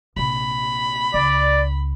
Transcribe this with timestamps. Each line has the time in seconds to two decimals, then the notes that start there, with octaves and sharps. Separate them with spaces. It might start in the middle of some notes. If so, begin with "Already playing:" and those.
0.17 A#1 C3 B5
1.14 C#2 D5